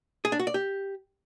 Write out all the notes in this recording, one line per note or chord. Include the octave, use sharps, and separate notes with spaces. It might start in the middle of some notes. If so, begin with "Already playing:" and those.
G#4
D4
F#4
D5
G4